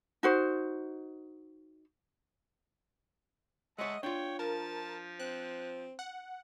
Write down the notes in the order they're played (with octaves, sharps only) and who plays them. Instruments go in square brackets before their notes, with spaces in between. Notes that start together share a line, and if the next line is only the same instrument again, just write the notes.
[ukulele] D#4 F#4 C5
[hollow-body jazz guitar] G#3 C#5 [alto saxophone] D#5 [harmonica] E5 F#5 A5
[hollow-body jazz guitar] D4 F4 [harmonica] C#5 [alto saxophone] G5
[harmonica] F3 [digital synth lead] A#4 [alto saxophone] A5
[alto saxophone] C4 [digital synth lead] F#6
[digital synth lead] F#5